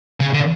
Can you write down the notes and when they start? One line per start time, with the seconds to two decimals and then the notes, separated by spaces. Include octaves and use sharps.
0.20 C#3
0.34 D3